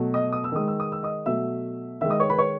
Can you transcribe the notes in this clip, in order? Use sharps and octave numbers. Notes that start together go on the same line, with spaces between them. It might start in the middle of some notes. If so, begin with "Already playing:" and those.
Already playing: B2 F#3 A3
D#5 D#6
D#6
E6
D#3 G#3 D#6
E6
D#6
E6
D#5 D#6
B2 F#3 A3 E5 E6
D#3 G#3 E5 E6
D#5 D#6
C#5 C#6
B4 B5
C#5 C#6